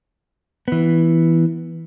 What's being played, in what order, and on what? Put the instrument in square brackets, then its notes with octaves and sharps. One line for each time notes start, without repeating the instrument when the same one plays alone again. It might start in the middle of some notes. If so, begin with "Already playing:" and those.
[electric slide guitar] E3 B3